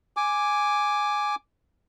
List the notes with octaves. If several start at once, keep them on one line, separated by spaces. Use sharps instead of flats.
G#5 D6